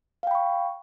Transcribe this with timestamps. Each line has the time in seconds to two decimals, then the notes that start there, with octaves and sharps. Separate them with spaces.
0.23 F5
0.27 G5
0.31 B5
0.35 C#6